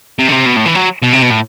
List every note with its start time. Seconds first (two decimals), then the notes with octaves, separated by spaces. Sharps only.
0.19 C3
0.29 D3
0.32 C3
0.46 B2
0.57 A2
0.66 E3
0.75 F#3
1.03 B2
1.13 C3
1.23 B2
1.31 A2